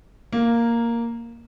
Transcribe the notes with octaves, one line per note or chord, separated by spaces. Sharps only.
A#3